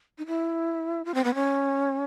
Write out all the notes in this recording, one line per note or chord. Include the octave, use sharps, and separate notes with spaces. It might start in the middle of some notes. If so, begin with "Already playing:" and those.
D#4
E4
F4
C4
B3
C#4